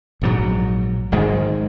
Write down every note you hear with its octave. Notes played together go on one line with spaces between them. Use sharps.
A#1 G#2 D#3 F#3
G#1 G#2 D#3 G#3